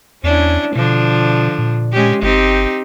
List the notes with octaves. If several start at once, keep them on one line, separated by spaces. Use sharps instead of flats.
E2 C#4 D4 E4
B2 D3 F3 D4
A#2
G#3 C#4 G4
G1 C4 D#4 G4